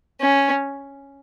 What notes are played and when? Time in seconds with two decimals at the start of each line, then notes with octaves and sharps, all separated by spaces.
0.21 C#4